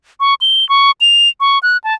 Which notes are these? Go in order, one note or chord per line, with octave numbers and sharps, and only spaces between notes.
C#6
G7
C#6
F7
C#6
F#6
A5